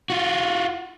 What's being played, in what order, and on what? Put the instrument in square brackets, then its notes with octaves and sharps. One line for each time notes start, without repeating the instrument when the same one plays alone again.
[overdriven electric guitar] F4 F#4